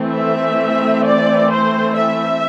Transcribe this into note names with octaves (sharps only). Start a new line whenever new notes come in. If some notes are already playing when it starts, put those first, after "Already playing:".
Already playing: E3 A3 C4
E5
D5
C5
E5